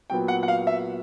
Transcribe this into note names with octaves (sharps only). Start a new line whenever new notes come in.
A#2 F#3 B3 G5
F#5
F#5
F5
E5